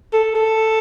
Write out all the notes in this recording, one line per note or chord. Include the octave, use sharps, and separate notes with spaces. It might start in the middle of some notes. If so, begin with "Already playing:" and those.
A4
A4